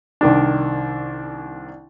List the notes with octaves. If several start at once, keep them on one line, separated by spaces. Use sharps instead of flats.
C2 D#3 D4